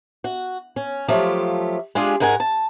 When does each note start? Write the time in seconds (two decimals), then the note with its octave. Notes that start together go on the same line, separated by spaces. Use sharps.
0.24 F#4
0.76 C#4
1.08 F3 F#3 A3 F4 G4
1.95 G#3 D4 F4 G4 G#4
2.20 G#2 G#3 A#4 F#5 G#5
2.40 A5